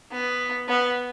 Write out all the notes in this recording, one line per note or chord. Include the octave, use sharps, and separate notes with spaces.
B3
B3